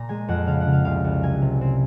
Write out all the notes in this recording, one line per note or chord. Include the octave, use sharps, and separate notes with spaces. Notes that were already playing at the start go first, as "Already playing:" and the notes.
Already playing: A#2 A#5
G#3 G#5
F2 F#5
C#3 F5
F#5
C#3
F5
C2 F5
C2
F#3 G#5
C3
C4